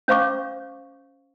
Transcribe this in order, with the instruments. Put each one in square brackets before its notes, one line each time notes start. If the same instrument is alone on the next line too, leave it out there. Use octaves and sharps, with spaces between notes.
[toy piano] C#4 C5 F5 C#6 D6